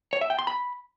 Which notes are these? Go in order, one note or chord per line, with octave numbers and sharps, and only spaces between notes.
C#5
E5
G5
C6
B5